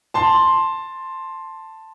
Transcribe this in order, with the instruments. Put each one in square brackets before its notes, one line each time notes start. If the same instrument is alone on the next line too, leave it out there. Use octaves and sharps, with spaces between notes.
[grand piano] A5 C6